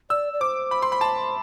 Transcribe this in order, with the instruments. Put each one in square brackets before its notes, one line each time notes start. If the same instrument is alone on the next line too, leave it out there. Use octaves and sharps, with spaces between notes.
[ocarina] D5 [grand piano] E6
[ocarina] D5
[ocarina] C5 [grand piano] D6
[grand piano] B5
C6
B5
A5